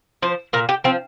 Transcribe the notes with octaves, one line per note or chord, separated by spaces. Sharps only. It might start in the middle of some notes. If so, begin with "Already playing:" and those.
F3 C5
A#2 A#4
G4
F3 C4